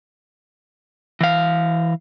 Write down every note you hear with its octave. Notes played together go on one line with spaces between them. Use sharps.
E3 F5